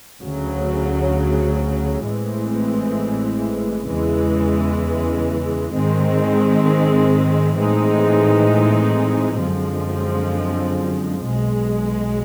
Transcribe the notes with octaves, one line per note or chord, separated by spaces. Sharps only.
D2 C#3 F#3
A1 A2 E3 G#3 C4
E2 C#3 E3 G#3
G#2 D#3 G#3 C4
A2 E3 G#3 C4 D#4
F#2 D3 F3 G#3 C4
B1 B2 G#3